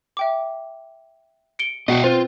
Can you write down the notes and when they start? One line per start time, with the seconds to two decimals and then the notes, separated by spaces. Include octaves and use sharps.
0.17 E5 G5 D6
1.59 C#7 D7 G7
1.88 B2 D#5 F#5 G5
2.04 C4 F4 B4 C5